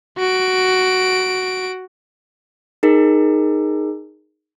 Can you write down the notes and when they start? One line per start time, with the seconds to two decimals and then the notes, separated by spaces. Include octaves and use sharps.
0.18 F#4 D7
2.83 D#4 G#4 A#4